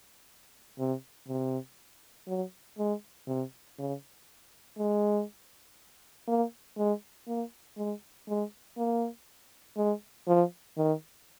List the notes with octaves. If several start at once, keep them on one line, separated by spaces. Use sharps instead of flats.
C3
C3
F#3
G#3
C3
C#3
G#3
A#3
G#3
A#3
G#3
G#3
A#3
G#3
F3
D#3